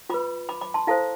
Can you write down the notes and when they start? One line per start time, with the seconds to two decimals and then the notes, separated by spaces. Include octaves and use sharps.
0.09 F4 B4 B5 D6
0.49 B5 D6
0.61 B5 D6
0.74 A5 C6
0.87 E4 A4 C5 F5 A5